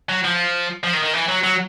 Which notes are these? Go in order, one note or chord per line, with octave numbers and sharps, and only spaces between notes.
F#3
F3
F3
D#3
D#3
E3
F#3
F#3